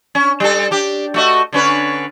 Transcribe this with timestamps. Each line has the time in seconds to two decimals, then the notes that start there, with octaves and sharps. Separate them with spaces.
0.15 C#4
0.40 G3 A4
0.71 D4 G4
1.14 A3 F#4 D#5
1.53 D3 C#4 B4